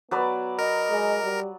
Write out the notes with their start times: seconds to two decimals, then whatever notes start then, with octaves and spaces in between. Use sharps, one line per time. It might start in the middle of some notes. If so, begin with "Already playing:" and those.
0.11 F#3 B3 B4 D5
0.59 A#4 D#5
0.91 G#3
1.23 G3